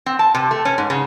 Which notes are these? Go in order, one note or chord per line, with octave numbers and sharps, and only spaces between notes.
C4
A5
C3
A3
C#4
G#2
C#3